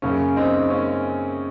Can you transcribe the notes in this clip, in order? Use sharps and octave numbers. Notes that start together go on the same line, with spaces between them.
F#2 C#3 A#3 C#4
C4 D#4
A#3 C#4